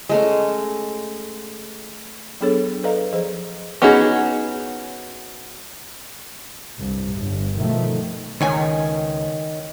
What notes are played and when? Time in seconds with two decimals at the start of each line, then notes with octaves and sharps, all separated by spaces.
0.09 G#3 A3 C#4
2.41 F#3 B3 D4 G#4 A4 C#5
2.84 A4 B4 D5 D#5 F5 A#5
3.12 F3 G#4 C5 D#5
3.82 B3 C#4 D#4 F#4 G#4
6.77 C2 G2
7.17 G1
7.54 B2 D#3 F3 A3
8.41 C#2 D#3 C#5 G#5